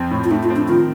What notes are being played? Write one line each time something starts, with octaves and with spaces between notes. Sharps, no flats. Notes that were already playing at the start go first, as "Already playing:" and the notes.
Already playing: F2 C4
A2
F4
A3 D#4
F4
C4
D4
D#3 F4